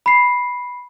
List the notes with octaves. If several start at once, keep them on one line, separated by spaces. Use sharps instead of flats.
B5 C7